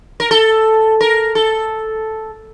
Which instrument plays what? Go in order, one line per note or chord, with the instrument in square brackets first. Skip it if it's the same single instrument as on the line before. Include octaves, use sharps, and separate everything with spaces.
[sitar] A#4
A4
A#4
A4